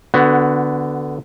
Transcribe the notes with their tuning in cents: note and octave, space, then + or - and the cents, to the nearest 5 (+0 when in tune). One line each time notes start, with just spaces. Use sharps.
D3 +0 B3 +15 F#4 +0